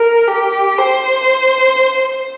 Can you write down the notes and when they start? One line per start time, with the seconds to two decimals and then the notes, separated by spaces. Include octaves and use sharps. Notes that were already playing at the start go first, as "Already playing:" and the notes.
Already playing: A#4
0.28 G4
0.78 C5